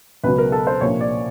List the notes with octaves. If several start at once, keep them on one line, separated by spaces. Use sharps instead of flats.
C#2 B2 F#3 B4
A#4
A4
C5
C2 A#2 F3 A#3 D4 C#5
D5